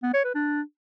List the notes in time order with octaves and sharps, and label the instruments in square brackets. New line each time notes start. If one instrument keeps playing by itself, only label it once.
[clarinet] B3
C#5
B4
D4